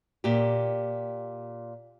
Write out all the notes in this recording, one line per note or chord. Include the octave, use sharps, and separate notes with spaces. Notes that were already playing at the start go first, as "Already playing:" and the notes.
A#2 G4